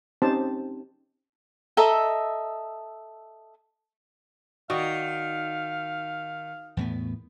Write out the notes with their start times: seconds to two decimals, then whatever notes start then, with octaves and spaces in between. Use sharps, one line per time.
0.22 C4 C#4 D#4 G4 C5 A5
1.77 A4 D#5 E5 A#5
4.70 D#3 F#4 D5 D#5 F5
6.77 E2 A2 B3